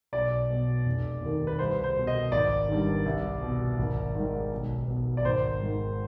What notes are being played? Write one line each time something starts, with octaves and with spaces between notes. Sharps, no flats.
B1 D5
B2
F1
D#2 D#3
B4
C2 C5
C5
B2
D#5
G#1 D5
G2 D#3
C2
B2
G#1
G#2 D#3
B1
B2
D5
G#1 C5
G#2 D#3